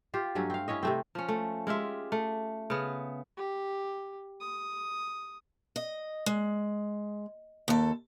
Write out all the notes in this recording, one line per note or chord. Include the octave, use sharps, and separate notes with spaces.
F4 G4 C5
G2 F#3 A3 C#4
C4 F5
C#4 E4 C#5 D#5
C3 A3 C4
F3 C#4
A3
G#3 F4 G4 E5
A3
C#3 B3
G4
D#6
D#5
G#3
D#2 A4